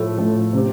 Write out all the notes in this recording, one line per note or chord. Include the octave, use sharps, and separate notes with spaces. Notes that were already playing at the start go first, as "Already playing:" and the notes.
Already playing: A2 F3 A3
A2 F3 A3
C3 F3 C4 G4